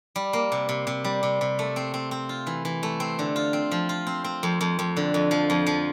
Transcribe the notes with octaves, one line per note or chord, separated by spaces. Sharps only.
G3
A#3
C3
C3
C3
G3
C3
C3
A3
C4
C4
C4
F4
E3
E3
A3
C4
D3
F4
C4
F3
F4
C4
C4
F2
F2
F2
D3
F2
F3
F2
F3